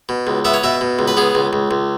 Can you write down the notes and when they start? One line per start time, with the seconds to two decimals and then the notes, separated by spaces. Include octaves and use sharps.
0.09 B2
0.27 C#2
0.45 B3 E5
0.54 C#5
0.63 B2 E5
0.81 B2
0.99 C#2
1.08 B4
1.17 B3 G#4
1.35 C#2
1.53 C#2
1.71 C#2